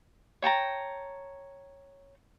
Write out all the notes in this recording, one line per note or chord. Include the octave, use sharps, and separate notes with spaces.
C#5 G5 A5 A#5